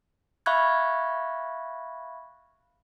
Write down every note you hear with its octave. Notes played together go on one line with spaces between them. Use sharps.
E5 F5 B5 C#6 F#6 G#6